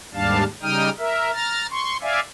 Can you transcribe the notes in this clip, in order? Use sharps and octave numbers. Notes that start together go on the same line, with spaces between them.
D#2 G#2 G3 D4 F5 A5
C#3 G3 D#4 G5 D#6 F6
A#4 E5
A#5 F6 A6
C6 C#6
D5 E5 F5 G#5